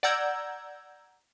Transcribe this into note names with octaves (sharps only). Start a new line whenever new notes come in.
D5 F#5 A#5 E6 G6 G#6